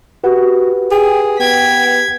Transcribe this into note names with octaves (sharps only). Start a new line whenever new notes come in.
F#4 G4 B4 F#5
G#4 G5
B3 G5 G#6 B6